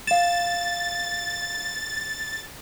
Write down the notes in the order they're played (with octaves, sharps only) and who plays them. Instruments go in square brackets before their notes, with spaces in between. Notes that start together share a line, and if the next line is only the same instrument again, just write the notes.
[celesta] F5 E7 [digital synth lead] A6